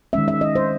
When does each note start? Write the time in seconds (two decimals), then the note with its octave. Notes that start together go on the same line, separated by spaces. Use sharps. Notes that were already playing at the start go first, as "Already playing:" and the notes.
0.13 D#3 G#3 C#4 E5
0.28 E5
0.41 D#5
0.55 C5